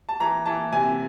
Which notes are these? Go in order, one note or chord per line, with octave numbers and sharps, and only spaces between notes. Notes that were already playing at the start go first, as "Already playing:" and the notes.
A5
E3 A#5
E3 A5
C3 G#5